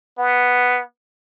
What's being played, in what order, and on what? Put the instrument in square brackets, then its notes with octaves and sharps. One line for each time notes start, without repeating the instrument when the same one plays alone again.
[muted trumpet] B3